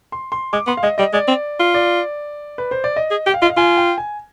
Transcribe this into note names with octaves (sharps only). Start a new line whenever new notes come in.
C6
C6
G#3 D6
B3 C6
F5
G#3 D#5
G3 D#5
G#3 D5
C4
F4
D5
B4
C5
D5
D#5
G#4
G4 G5
F5
F4 D#5
F5
F4 G#5
G5
G#5